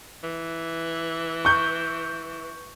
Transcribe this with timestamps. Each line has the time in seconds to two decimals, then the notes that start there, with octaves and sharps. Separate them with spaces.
0.24 E3
1.45 C#6 G6